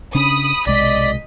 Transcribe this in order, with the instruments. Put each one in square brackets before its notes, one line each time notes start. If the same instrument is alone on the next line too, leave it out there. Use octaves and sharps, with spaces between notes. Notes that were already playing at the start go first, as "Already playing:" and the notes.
[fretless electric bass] C#3 C#4 D4 [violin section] B5 D#6
[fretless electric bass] B1 C3 G#3 [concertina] D5 [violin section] D#5 B6